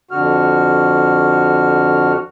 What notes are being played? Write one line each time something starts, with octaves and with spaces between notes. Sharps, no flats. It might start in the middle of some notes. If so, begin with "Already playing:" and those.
F2 D3 F#4 F6